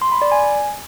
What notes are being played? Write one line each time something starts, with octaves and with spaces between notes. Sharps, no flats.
C6
B5
D5
G#5